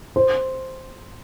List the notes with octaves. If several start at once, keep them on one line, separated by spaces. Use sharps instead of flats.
C5